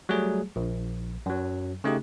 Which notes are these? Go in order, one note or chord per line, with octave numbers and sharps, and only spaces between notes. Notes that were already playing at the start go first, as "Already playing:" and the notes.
F#3 G3 A3 G#4
A#1
F#2 F#3
C#3 A3 D#4 G4